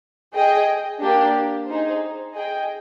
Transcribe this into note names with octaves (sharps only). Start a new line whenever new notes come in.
G#4 D#5 G5
A#3 D4 G4
D#4 G#4 C5
G#4 D#5 G5